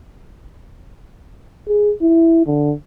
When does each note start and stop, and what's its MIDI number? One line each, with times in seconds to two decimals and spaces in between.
1.68 1.92 68
2.02 2.46 64
2.47 2.73 50